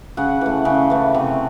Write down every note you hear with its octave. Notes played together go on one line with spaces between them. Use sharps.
C#3 F#5
E3 A3
C#3
E3 A3
C3